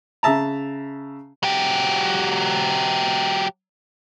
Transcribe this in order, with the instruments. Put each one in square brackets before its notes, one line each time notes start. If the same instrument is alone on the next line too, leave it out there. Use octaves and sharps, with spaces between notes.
[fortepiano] C#3 E5 A5 A#5
[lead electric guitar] F#3 G4